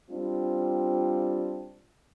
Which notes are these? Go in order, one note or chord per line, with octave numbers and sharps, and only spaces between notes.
G3 C4 D4 F4